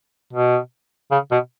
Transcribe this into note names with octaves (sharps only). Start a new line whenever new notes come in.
B2
C#3
B2